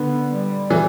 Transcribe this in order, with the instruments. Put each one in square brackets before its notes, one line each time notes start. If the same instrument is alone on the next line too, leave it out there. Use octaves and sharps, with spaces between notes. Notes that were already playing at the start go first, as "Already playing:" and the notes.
Already playing: [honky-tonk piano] D3 [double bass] B3
[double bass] G3
[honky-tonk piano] E3